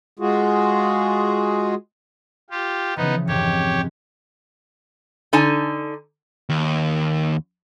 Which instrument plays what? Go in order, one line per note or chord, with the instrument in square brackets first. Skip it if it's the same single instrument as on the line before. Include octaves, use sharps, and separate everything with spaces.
[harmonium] G#3 F4 F#4 G#4
[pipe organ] F4 G4
[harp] C#3 E3 F3 [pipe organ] B3 D#4
[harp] F1 G#2 [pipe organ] G4 C#5
[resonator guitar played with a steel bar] D3 D#4 G#5 A5
[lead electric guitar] D#2